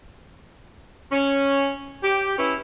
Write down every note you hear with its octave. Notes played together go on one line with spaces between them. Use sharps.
C#4
G4
C#4 E4 B4